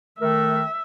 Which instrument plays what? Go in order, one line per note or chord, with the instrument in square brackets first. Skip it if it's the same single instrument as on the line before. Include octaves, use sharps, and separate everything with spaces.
[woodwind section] D#3 A3 A#4 [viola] E5